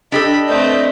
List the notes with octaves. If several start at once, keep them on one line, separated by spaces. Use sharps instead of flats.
D4 G4 A4 D#5 B5
A3 C4 B4 D5 D#5 G6